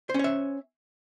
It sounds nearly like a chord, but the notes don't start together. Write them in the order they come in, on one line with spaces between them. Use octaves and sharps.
C5 C#4 C#5 E5